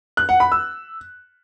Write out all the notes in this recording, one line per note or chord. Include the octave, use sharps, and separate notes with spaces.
F#6
F#5
B5
E6